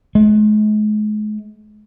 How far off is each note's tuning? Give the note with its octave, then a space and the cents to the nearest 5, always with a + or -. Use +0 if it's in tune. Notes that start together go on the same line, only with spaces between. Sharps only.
G#3 +40